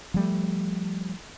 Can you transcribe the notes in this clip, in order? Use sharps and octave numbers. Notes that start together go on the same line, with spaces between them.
F3 G3 A3